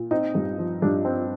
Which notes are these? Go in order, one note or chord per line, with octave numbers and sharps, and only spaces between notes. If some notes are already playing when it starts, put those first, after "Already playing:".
Already playing: A#2
C4 D#4
G2
F3
G2 D4
C4